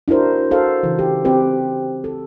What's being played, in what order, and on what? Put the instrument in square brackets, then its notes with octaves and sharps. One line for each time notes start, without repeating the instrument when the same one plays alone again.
[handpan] D4 E4 F#4 A#4 C5
F#4 A4 C5 F5
C#3 E3
G4
C4 G4 B4
A4